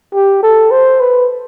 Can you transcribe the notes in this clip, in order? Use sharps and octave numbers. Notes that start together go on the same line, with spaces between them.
G4
A4
C5
B4